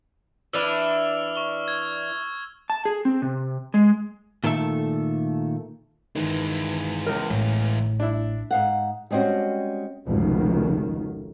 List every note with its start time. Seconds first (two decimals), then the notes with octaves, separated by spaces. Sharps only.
0.53 E3 D4 E4 E6 F6 F7
1.36 C#6 G7
1.68 G#6
2.70 A5
2.85 G#4
3.05 C4
3.22 C3
3.74 G#3
4.44 A#2 D#3 A3 A4 E5
6.16 G1 D#3 E3 G#3
7.07 C#2 A#4
7.30 A1 A2
8.00 D4 E4
8.51 G#2 F5 F#5
9.11 G3 G#3 C4 C#4 F#4
10.06 F1 C#2 B2 D#3